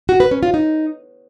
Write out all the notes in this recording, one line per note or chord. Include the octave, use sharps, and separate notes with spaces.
F#4
B4
C#4
F4
D#4